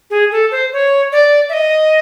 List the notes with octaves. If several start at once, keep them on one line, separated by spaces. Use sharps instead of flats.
G#4
A4
C5
C#5
D5
E5
D#5